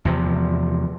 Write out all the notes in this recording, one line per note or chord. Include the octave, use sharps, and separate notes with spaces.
E2 C3 F3